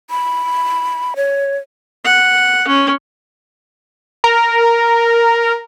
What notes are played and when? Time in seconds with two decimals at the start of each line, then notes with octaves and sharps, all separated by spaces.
0.10 B5
1.16 C#5
2.04 F#5
2.68 C#4
4.24 A#4